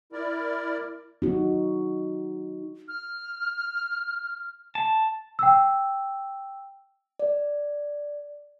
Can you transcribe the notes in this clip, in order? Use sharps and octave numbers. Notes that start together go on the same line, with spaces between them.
E4 A#4 D5
D#4 F#4
F6
A5
G5 E6
D5